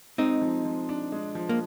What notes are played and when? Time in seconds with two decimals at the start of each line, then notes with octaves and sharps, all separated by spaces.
0.18 G#3 C4 D#4
0.41 F3
0.65 F3
0.89 D4
1.12 G#3
1.35 F3
1.49 A#3